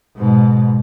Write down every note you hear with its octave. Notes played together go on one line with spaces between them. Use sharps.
G#2 B2